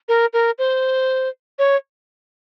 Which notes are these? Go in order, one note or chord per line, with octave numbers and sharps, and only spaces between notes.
A#4
A#4
C5
C#5